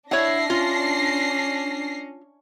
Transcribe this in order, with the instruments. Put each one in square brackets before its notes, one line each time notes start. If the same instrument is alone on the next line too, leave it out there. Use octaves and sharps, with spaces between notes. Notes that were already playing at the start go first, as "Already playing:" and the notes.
[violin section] D4 A#6 C7 [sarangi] E4 [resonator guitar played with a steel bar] C#5 F#5
[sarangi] C#4 [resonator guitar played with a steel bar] F4